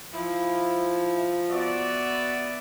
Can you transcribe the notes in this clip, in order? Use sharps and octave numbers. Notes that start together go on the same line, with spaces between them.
F3 E4
B3 F#4 D5 E5